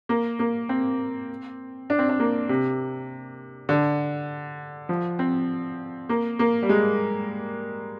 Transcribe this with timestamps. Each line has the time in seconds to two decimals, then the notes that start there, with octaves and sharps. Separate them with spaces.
0.09 A#3
0.39 A#3
0.69 C4
1.90 D4
1.99 C4
2.09 D4
2.20 A#3
2.49 C3
3.69 D3
4.89 F3
5.19 C4
6.09 A#3
6.39 A#3
6.63 G3
6.69 G#3